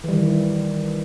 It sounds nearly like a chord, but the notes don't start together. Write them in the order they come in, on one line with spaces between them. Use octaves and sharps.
E3 G3 D#3